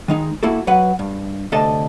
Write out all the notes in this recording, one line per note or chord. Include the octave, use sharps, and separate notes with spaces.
D#3 G#3 D#4
A#3 E4 F#4 A4
F#3 B4 F#5
G2
D2 C3 A4 D5 D#5 A5